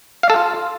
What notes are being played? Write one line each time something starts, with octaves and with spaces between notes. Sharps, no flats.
F5
A4
F4